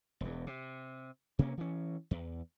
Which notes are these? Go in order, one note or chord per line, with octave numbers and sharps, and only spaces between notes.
E1 E2
C3
C3 A#3 C#4
E3 C#4
E2